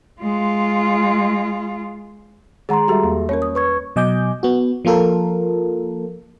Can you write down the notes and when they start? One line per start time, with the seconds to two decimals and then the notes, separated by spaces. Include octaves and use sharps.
0.21 G#3 F4
2.69 D#3 G#3 G#4 F#5 A#5 C6
2.88 G3 F#4 G4 A4 E5
3.03 E2 A#3
3.29 A#3 C#4 A#4 C#5
3.42 D#6
3.55 B4 C#6 G#6
3.96 B2 F#3 D#5 G#5 D6 G6
4.43 B3 F#4
4.85 F3 A#3 F4 A4 A#4